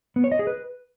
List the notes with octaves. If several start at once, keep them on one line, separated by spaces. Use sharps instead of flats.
B3
C#5
D#5
G#4
B4